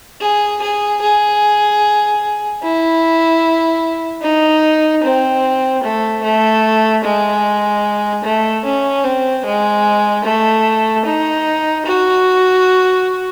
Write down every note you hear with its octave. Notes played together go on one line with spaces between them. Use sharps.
G#4
G#4
G#4
E4
D#4
C4
A3
A3
G#3
A3
C#4
C4
G#3
A3
D#4
F#4